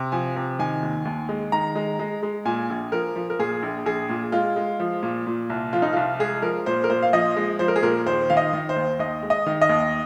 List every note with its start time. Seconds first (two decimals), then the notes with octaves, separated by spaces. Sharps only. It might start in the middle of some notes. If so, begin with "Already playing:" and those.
Already playing: C3
0.12 F3 G#5
0.36 C3
0.59 D#3 G#5
0.83 D#2
1.05 D#2
1.29 G#3
1.52 D#3 A#5
1.75 G#3
1.99 G#3
2.23 G#3
2.45 A#2 G#5
2.70 A#1
2.92 F3 A#4
3.16 F3
3.30 A#4
3.39 A#2 G#4
3.63 A#1
3.86 A#1 G#4
4.09 A#2
4.32 G#3 F4
4.56 G#3
4.80 F3
5.03 A#2
5.27 A#2
5.50 C2
5.73 F3 F4
5.82 D#4
5.93 C2 F4
6.19 G#3 G#4
6.42 F3 A#4
6.66 A#2 C5
6.84 A#4
6.89 A#2 C5
7.02 F5
7.13 F3 D#5
7.36 G#3
7.59 F3 C5
7.68 A#4
7.76 G#4
7.82 A#2 A#4
8.06 D#2 C5
8.30 D#3 F5
8.37 D#5
8.53 D#3
8.69 C5
8.76 D#2
8.99 D#2 D#5
9.23 G#3
9.30 D#5
9.46 D#3
9.62 D#5
9.69 D#2